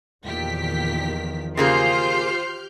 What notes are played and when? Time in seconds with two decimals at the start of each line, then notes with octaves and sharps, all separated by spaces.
0.25 E2 A#2 D#3 F3 G4 B6
1.57 C#3 A#3 F4 G4 G#4 C5 F6 G6